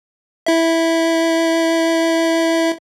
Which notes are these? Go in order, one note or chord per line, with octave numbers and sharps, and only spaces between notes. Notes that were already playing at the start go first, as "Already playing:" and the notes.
E4 E5